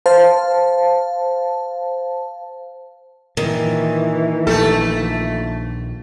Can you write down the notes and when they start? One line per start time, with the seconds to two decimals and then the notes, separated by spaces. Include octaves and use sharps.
0.06 C5 F5 A5
3.37 A#2 D#3 E3
4.47 A#1 A#2 A3 A4